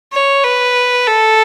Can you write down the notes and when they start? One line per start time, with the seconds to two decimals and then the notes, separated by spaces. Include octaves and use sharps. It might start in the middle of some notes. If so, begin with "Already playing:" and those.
0.12 C#5
0.44 B4
1.06 A4